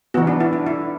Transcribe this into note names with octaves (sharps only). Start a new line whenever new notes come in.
E3 B3 F#4
D4
E4
D4
E4